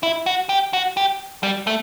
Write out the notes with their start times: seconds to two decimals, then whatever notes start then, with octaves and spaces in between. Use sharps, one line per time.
0.03 E4
0.26 F#4
0.49 G4
0.73 F#4
0.97 G4
1.43 G3
1.67 A3